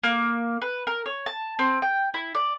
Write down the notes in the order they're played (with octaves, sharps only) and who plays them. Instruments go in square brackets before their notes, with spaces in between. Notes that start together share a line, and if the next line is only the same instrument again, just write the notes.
[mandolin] A#3
B4
A#4
C#5
A5
C4
G5
E4
D5